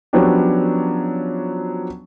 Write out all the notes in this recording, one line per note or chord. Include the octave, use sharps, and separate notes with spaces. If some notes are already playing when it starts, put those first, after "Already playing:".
F3 F#3 B3 C#4 D4 G4